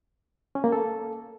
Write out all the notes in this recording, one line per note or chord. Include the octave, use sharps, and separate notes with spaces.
C#4
A#3
A4